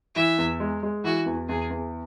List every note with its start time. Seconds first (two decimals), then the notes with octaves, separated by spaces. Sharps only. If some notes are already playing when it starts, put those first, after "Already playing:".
0.15 E3 E5
0.38 E2
0.60 G#3
0.83 G#3
1.04 E3 F#4
1.26 E2
1.49 E2 G#4
1.70 E2